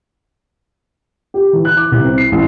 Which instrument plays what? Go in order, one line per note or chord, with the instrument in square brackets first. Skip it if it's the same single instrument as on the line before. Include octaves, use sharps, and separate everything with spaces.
[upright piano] G4
E3
F#6
D6
C2
C4
C7
A1